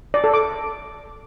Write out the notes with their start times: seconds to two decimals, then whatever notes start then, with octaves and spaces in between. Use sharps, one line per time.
0.14 D5
0.24 A4
0.34 D6